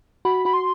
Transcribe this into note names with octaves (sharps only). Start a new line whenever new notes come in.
F#4 B5
F#4 B5
C6